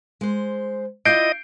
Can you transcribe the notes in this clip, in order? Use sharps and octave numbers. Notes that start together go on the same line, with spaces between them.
G#3 C5
E4 F4 D5 D#5 G6 C7 D7